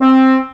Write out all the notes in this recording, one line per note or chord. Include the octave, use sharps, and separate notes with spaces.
C4